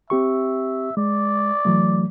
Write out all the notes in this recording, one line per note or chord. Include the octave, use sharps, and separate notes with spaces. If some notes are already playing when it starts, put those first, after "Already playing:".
C4 G4 E5 C#6
G#3 D5
E3 F#3 A3